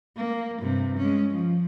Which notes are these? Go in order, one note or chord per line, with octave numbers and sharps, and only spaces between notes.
A#3
G2 C3
G#3 C#4
F3